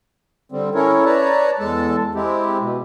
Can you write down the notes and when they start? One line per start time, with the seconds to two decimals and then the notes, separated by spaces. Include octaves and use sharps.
0.52 D3 G3 C4
0.75 C#4 E4 A4 A#4 C#5
1.05 B4 C#5 D5 A5 A#5
1.59 E2 G#3 A4 A5
2.15 G#3 C4 E4 G4
2.60 B2